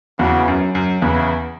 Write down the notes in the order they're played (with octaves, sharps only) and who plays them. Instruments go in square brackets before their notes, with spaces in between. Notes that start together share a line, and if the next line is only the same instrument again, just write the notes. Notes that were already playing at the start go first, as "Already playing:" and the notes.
[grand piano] E2 [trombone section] C#3 E3 B3 F#4
[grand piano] F#2
F#2
[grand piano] E2 [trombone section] C#3 E3 C#4 E4 B4